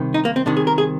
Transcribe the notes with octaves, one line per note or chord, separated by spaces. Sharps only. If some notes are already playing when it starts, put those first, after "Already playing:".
Already playing: C2 C3 D#3
D#4
A#3
C4
C2 C3 D#3 D4
G#4
A#4
G#4